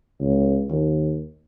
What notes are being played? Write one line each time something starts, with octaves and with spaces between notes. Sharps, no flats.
C#2
D#2